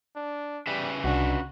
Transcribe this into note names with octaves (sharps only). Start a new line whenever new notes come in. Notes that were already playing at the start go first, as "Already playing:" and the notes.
D4
C#3 G3 B4 E5
C2 D4 F#4